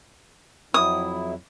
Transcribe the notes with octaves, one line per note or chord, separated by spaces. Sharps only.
F2 F#3 E4 D#6